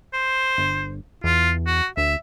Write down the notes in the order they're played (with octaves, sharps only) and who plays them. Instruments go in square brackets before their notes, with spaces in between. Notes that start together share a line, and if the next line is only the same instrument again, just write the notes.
[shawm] C5
[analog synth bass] G1
[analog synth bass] E2 [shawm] F4
[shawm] F#4
[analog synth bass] D2 [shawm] E5